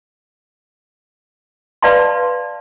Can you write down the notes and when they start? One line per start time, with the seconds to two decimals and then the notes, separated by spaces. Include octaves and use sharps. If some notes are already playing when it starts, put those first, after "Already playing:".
1.82 B4 D5 F5 A5 C6